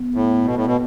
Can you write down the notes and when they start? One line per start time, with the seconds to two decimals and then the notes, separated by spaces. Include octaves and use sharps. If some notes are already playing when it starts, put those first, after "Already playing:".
Already playing: B3
0.14 A2
0.45 B2
0.55 A2
0.66 B2